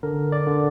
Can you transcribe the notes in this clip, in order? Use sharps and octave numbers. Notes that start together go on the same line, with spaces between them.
D3 A#4
D5
D3